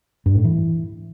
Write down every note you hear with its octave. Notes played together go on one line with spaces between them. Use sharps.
G2
A2
E3